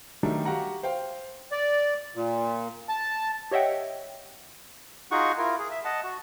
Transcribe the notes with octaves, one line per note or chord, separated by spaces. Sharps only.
D#3 F#3 G3 A3 D4 D#4
F#4 G4 F5 F#5 A#5
C5 F5 G5
D5
A#2
A5
G4 C#5 D#5 E5 F#5 G5
D#4 F4 F#4 G#4 F#5 C#6
E4 F4 A#4
G#4
E5
D#5 F#5 A5
F#4